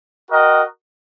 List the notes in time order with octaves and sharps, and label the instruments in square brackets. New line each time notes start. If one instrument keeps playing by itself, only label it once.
[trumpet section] F#4 A#4 D#5 G5